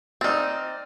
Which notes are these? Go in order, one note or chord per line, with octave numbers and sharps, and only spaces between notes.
C4 D#4 D5 F6 A6